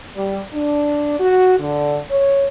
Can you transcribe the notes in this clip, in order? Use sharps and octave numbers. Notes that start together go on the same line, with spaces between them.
G3
D4
F#4
D3
C#5